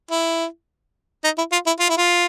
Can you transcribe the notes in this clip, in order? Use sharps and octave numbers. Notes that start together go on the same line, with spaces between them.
E4
D#4
E4
F4
E4
F4
E4
F4